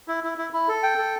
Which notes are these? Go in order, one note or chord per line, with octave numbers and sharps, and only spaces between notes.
E4
E4
E4
E4
A4
G5
A4